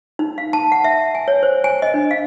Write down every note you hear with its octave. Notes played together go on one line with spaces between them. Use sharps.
D#4
F5
A5
F#5
E5
G#5
C#5
C5
G#5
D#5
D4
F5